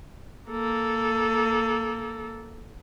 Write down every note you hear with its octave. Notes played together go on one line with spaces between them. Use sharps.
A#3 A4